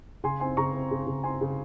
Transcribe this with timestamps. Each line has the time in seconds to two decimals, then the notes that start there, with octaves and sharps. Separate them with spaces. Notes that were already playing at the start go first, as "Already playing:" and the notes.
0.24 C#3 G#5 C6
0.40 C4 G#5 C6
0.57 C#3 A#5 C#6
0.74 C4
0.91 C#3
1.07 C#3
1.23 C4 G#5 C6
1.41 C#3